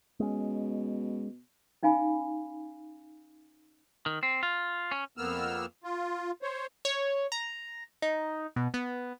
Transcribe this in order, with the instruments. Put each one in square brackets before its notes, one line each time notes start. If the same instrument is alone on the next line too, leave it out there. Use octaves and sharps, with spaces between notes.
[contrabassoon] B2 [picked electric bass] G#3 C#4
[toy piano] C#4 D#4 F5 G#5 B5
[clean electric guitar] D#3
C4
F4
C#4
[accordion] F2 A#3 B3 E6 F6
F4
C5 C#5
[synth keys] C#5
A#5
D#4
B2
B3